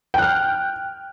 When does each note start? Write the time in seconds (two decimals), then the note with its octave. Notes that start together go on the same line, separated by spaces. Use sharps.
0.14 G5
0.18 F#6
0.22 F6